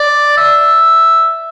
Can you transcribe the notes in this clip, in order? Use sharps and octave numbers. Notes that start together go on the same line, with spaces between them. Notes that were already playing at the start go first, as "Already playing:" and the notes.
Already playing: D5
E5